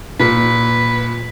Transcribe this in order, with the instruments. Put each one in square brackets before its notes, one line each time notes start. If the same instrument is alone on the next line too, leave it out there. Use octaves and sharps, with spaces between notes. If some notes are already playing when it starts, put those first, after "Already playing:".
[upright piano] A#2 [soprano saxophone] B4